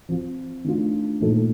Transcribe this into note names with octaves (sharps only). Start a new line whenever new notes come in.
F3 C4 F4
D#3 A3 D4 F4
A#2 F3 A3 D#4 A4